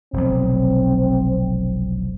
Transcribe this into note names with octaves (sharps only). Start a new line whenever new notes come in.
F1 B1 C4